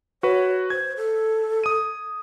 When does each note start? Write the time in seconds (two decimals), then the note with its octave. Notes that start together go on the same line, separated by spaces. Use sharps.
0.23 F#4 B4 C#5
0.70 C5 G#6
0.97 A4
1.64 D#6 D#7